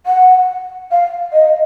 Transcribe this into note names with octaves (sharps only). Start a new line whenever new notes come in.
F#5
F5
D#5